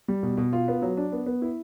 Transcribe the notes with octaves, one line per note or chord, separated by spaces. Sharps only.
G3
B2
B2
F4
B3
F#3
D4
B3
B3
E4